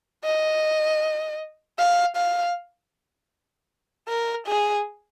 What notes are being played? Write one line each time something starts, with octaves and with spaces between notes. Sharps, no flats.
D#5
F5
F5
A#4
G#4